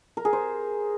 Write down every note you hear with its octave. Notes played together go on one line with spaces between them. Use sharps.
A#4
G#4
C5